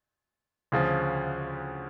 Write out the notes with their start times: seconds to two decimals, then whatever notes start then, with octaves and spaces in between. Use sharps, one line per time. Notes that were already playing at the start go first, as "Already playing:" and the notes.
0.72 D2 C#3 F3